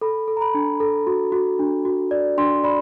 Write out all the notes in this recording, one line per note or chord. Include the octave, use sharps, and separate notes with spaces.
A4 B5
A4
A#5
B5
D4
A4
F#4
F#4
D4
F#4
D5
D4 C6
D5 B5